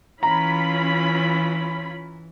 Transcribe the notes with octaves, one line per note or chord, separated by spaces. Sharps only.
E3 C#4 F4 A#5 B5